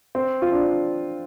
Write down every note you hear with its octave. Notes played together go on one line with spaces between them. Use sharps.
C4
F4
D4